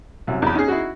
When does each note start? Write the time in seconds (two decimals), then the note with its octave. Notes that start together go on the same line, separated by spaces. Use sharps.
0.27 C2 F#2
0.42 E2 B5
0.55 C#4 D#4 G#4
0.68 E4 F#4